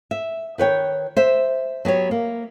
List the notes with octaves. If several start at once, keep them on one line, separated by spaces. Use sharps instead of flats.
E5
D#3 B4 C#5 G5
C5 E5
F#3 B3 G4 C#5
A#3